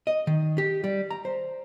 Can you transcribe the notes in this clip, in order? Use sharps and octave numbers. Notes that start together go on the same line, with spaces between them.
D#5
D#3
G4
G3
A#5
C5